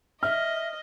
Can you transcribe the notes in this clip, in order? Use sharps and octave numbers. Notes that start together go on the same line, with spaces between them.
D#5 E5 F6